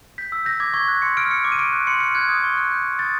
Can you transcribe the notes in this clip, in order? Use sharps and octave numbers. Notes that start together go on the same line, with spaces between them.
G6 B6
E6
G6 A#6
D6 G#6
C#6 G#6
F#6
C6 C#7
F6 D7
F6 C#7
D6
D#7
C#6 D7
F#6
C6 C#7
F6 C#7
F#6 G#6
D#6
C#6
F#6
G6
D#6
D#6 A6